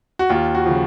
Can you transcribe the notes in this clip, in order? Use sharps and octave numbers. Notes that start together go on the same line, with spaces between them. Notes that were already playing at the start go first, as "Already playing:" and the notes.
F#4
D#2 F4
F#4
C#3 F3